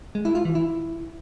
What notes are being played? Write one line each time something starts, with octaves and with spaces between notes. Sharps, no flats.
G#3
E4
F4
E3
E4